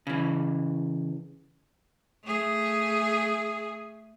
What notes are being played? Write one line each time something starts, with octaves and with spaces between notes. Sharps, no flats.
C#3 E3
A3 G#4